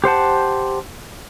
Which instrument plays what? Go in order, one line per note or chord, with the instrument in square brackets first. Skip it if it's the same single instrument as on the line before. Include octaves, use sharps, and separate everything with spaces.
[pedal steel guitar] G4 C5 F#5 A5